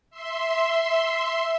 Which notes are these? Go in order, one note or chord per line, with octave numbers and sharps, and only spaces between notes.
E5 C6